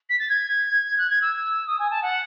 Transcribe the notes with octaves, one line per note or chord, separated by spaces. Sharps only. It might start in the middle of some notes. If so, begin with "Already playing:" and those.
B6
A6
G#6
F#6
G#6
E6
D#6
G#5
A5
F#5